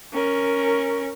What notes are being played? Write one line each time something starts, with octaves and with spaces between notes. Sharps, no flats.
C#4 A#4